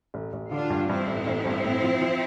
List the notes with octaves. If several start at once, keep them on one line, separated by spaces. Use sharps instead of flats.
A1
A1
D3 D4 F4
G2
G2 C4 E4
A1
A1
G2
A2
F3
F3